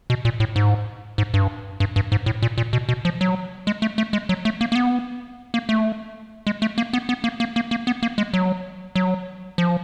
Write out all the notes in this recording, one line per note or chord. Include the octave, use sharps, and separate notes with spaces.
B2
A#2
A2
G#2
G#2
G2
G2
G2
G#2
A2
A#2
A#2
B2
B2
F3
F#3
G#3
A3
A3
G#3
F#3
A3
A#3
A#3
B3
A#3
A3
G#3
A3
A#3
B3
B3
A#3
A#3
A#3
A#3
B3
A#3
G#3
F#3
F#3
F3